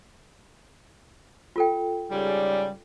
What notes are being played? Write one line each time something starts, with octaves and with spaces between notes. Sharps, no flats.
F4 A4 G5
G#2 C#3 G3